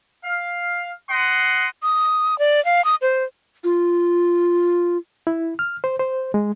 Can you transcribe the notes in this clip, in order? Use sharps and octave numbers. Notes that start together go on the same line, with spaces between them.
F5
D#5 F#5 C6
D#6
D5
F5
D#6
C5
F4
E4
F6
C5
C5
G#3